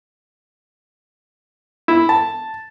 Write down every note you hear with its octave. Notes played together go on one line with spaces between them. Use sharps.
E4
A5